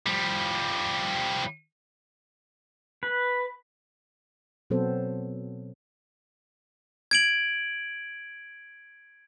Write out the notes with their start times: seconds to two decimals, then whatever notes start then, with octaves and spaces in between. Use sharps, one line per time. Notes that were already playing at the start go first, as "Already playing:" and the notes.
0.06 F3 G3
3.03 B4
4.70 B2 F#3 B3 C4 A4 C5
7.11 G#6 D7 F#7